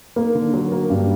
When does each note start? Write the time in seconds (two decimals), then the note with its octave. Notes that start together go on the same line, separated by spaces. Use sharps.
0.16 A#3
0.35 D3
0.54 F#3
0.72 A#3
0.90 G2